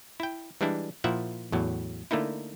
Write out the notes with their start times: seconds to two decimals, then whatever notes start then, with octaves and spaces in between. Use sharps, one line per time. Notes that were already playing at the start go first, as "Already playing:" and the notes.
0.20 E4 G5
0.61 E3 G3 G#3 D4 E4
1.04 A#2 F3 E4 E5 F#5
1.52 E2 A2 F#3
2.11 D3 A3 A#3 D#4 E4